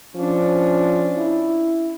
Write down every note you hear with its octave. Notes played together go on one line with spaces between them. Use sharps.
F3 C#4 D4
E4